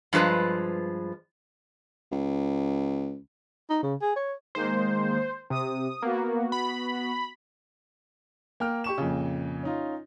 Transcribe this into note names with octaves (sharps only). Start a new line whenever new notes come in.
G2 F3 G#3 B4 A#5
C#2
D#4
C#3
G#4
C#5
D#3 G#3 A#3 C5
C3 D#6
A#3 B3 F#4
B5
A#3 G5 F6
G4 C#6 E7
F2 A#2 C#3
C#4 D#4 F4